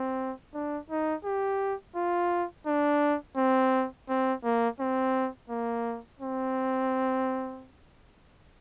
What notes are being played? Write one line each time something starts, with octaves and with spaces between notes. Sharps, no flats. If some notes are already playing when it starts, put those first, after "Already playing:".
Already playing: C4
D4
D#4
G4
F4
D4
C4
C4
A#3
C4
A#3
C4